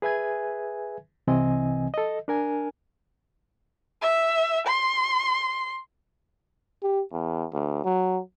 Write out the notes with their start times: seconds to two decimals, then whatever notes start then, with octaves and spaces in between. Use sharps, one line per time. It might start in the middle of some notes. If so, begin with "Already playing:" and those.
0.02 G#4 B4 E5 G#5 G#6
1.27 C2 C3 E3 C4 D#5 G#5
1.94 A4 D#5
2.28 D4 A#4 G#5
4.02 E5
4.66 C6
6.83 G4
7.13 E2
7.53 D2
7.85 F#3